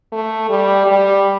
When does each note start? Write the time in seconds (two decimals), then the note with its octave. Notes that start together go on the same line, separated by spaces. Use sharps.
0.12 A3
0.49 G3
0.86 G3